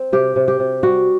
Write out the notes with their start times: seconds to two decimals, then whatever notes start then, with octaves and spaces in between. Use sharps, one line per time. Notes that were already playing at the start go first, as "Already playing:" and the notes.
Already playing: C4
0.12 C3 G4
0.36 C3
0.48 G4
0.59 C3
0.83 G3 F#4